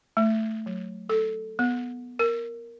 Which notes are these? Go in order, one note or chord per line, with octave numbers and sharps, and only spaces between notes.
A3
F#3
A4
B3
A#4